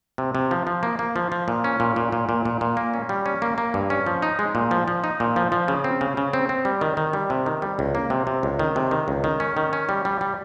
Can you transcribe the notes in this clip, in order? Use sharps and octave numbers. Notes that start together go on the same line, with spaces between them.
C3
C3
F3
F3
A#3
A#3
F3
F3
A#2
C#4
A#2
A#2
A#2
A#2
A#2
A#2
A#3
C#4
G3
C#4
A#3
A#3
G2
C#4
F3
D#4
G#3
A#2
F3
F3
D#4
A#2
F3
F3
C#3
C4
C#3
C#3
C4
C4
G3
D#3
D#3
G3
C3
D#3
G3
C#2
A#3
C3
C3
C#2
D#3
C3
D#3
C#2
D#3
C#4
D#3
C#4
G3
G3
G3